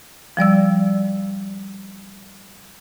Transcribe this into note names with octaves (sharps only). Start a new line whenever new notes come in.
F3 G3 D5 E6